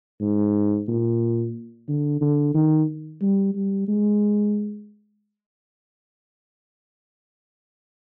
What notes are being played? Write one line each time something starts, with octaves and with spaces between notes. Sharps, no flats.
G#2
A#2
D3
D3
D#3
G3
G3
G#3